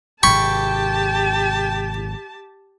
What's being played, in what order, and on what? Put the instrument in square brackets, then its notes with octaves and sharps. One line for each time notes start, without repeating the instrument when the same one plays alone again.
[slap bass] G#1 C3 [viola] G4 A5 [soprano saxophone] G5 [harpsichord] B5 C#6